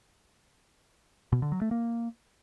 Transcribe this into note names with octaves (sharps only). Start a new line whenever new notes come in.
B2
D3
F#3
A3
A#3